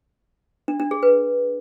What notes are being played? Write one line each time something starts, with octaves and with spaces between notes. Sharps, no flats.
D4
D4
G#4
B4